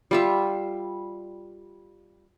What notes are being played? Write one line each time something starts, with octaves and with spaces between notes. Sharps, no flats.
G3 F4 E5